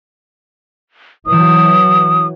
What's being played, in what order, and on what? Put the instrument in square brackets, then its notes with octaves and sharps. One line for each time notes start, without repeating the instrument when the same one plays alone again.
[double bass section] E3 F#3 [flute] D#6